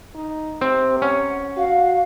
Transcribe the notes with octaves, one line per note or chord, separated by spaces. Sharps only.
D#4
C3 C4
C#4 F#5
F#4 F5